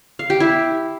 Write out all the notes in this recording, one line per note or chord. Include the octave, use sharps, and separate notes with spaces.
F5
G4
E4